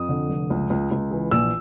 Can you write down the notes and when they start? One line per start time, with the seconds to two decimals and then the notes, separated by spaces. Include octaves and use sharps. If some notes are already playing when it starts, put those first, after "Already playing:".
Already playing: F2 D#6
0.09 D3
0.29 F1
0.50 C#2
0.70 C#2
0.91 C#2
1.11 E3
1.31 A#1 E6